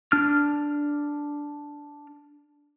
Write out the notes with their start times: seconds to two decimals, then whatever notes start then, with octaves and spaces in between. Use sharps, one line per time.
0.12 D4 F6